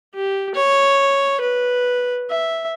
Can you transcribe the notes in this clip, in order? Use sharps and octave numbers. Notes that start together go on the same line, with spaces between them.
G4
C#5
B4
E5